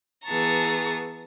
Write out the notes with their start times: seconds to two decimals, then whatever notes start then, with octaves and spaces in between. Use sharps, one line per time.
0.25 E3 B3 G#4 A5 A#5 C#6